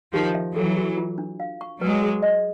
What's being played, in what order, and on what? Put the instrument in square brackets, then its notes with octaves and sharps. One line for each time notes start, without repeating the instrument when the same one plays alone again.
[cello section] D#3 F3 [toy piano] G4
[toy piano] E5
[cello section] E3 F#3 [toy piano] A4
[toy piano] F#4
F4
D4
F5
C#6
[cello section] F#3 G#3 [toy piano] B4
[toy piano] G#4
D#5